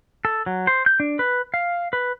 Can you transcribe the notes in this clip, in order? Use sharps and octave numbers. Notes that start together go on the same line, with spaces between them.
A4
F#3
C5
G6
D4
B4
F5
B4